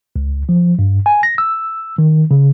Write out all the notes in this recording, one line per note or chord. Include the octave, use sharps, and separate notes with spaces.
C#2
F3
G2
G#5
A#6
E6
D#3
C#3